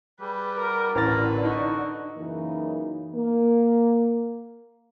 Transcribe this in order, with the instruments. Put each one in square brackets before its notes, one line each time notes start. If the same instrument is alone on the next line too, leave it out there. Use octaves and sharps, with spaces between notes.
[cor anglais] G3 [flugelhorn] G#4 [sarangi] B4
[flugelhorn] F#4 [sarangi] A#4
[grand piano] A1 A6 [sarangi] D3 [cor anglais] A#4 [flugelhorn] B4
[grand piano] D#4 [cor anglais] F#4
[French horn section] F#2 C#3 E3 A#3 D#4
A#3